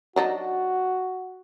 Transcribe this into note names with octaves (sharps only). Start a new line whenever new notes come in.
F#3 D4 D#4 F#4